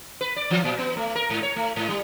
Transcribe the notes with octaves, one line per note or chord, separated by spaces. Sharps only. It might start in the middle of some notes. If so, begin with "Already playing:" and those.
B4
D5
E3
A#2
B3
A3
A#4
G#2
C#5
A3
G#2
G3